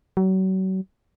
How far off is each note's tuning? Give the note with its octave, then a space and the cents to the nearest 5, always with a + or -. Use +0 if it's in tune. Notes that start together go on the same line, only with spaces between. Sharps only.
F#3 +35